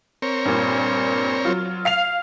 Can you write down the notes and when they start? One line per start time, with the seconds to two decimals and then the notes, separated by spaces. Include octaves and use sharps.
0.22 C4 A#4 C#5
0.45 G2 A#2
1.45 F#3 F4
1.85 F5 C7 F7